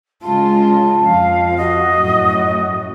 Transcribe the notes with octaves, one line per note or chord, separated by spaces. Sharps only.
C#3 G#3 F4 A5
F2 F5
F#4 D#5
F#2 A2